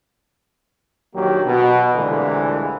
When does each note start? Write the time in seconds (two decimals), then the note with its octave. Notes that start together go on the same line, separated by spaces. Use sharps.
1.15 A#1 D#3 F#3 A#3 G4
1.46 B2
1.95 C2 A#2 D3 E3 G#3 A3